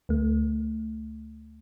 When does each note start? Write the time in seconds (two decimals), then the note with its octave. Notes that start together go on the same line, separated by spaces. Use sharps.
0.09 D2 A3